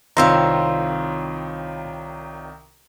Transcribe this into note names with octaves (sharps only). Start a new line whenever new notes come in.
C2 D#3 C4 F4 C#5 A#5 C6 E6